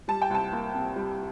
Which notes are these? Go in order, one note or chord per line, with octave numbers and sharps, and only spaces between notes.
G3 A5
G5
C2 A5
A#3
C3
G3